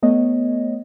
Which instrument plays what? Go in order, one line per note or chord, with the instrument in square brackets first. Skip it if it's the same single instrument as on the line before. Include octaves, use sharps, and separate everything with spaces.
[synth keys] A3 B3 C#5 D#5